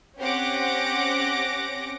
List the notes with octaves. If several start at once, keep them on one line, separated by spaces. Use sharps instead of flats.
C4 C#4 G4 F#5 D6 A#6